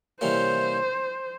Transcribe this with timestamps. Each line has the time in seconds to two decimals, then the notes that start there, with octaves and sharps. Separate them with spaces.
0.21 C3 E3 G3 A#3 C#4 C5